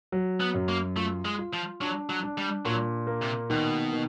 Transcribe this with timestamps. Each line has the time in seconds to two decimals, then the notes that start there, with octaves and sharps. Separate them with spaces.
0.12 F#3
0.40 B3
0.54 F#2
0.69 A#3
0.97 A3 F4
1.25 G#3
1.39 F4
1.53 F3
1.81 F#3 D4
2.10 F#3
2.23 D4
2.38 G3
2.65 A#2 F#3
3.07 A#3
3.22 C3
3.50 B2 D#3
3.93 D#3